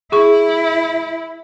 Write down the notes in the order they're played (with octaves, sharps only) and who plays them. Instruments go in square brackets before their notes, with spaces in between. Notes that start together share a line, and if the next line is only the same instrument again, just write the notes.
[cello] E4 [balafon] G#4 C#6